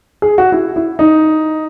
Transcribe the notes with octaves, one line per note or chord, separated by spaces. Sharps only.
G#4
F#4
E4
E4
D#4